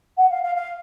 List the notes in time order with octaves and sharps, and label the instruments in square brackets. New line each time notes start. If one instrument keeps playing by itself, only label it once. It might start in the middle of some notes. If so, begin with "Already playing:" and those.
[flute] F#5
F5
F5
F5